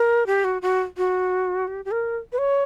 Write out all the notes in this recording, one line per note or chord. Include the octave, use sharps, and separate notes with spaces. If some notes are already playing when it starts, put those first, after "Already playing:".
Already playing: A#4
G4
F#4
F#4
F#4
G4
G4
A#4
B4
C#5